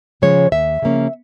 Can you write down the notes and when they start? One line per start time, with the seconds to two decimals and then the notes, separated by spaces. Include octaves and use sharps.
0.22 C#3 F3 G#3 C#4 C#5
0.52 D#2 E5
0.82 C#3 F3 A#3 C#4